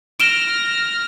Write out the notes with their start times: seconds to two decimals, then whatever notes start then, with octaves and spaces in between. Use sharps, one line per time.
0.20 F6 A#6 D7 E7 G7